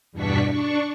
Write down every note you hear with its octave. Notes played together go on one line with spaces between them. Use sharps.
E2 G2 B2 D4 C#6 B6
D4 C#6